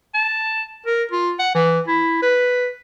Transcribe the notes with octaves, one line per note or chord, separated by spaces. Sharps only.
A5
A#4
F4
F#5
E3
E4
B4